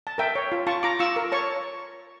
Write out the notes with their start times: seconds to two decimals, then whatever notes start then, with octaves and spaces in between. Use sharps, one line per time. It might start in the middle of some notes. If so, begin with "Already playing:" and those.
0.07 A5
0.18 A#4 E5 G5
0.35 C#5
0.52 F4
0.67 F4 A5 C#6
0.83 F4 A#5 D6
0.99 F4 C#6 E6
1.16 A#4
1.32 C#5 A5 C#6